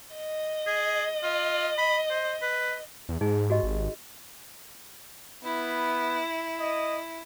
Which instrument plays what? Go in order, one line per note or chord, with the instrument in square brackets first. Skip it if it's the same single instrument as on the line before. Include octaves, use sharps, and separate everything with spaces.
[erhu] D#5
[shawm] G#4
F4
B5
C5
B4
[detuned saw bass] E2
[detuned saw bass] G#2 [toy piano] D#4 G#4
[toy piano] F#4 G4 D#5
[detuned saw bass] G#1
[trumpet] B3 [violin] E4
[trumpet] D#5